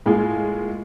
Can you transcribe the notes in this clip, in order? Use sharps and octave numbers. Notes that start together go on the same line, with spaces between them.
A2 G#3 A#3 F4 G#4